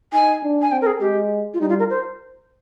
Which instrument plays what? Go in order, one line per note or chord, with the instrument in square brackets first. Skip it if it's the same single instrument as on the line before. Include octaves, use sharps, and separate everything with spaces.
[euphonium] D#4 [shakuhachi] G#5
[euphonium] D4
[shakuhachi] G#5
[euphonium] C4 [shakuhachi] G5
[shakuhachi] A#4
G#4
[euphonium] G#3 [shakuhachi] G4
[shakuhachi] F4
[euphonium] G3 [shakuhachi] D#4
[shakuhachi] F4
A#4
C5